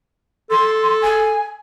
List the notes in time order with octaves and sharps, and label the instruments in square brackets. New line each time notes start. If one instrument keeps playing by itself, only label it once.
[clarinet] A4 [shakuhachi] C6
[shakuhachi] G#5